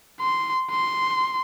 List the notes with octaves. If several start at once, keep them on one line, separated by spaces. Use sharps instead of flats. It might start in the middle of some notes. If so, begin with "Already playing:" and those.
C6
C6